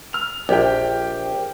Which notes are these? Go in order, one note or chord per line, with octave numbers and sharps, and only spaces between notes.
F6 F7
A#1 G4 G5